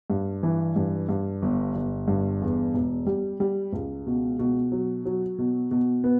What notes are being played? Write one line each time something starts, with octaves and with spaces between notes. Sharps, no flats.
G2
E3
G2
G2
G1
G1
G2
E2
E1
G3
G3
C#2
B2
B2
F#3
F#3
B2
B2
B3